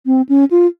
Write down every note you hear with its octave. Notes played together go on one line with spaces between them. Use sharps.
C4
C#4
F4